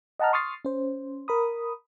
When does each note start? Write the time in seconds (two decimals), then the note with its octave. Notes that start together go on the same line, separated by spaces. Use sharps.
0.19 D#5 F#5 A5 A#5 F6
0.33 C6 C#6 D#6 F6 A6 C7
0.65 C#4 C5
1.28 A#4 B5 D#6